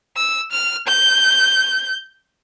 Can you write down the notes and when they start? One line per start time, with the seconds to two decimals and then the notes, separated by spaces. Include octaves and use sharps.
0.17 E6
0.52 F6
0.88 G6